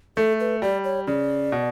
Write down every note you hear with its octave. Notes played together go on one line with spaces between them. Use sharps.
A3 A4
B4
G3 D5
C#5
C#3 D5
B2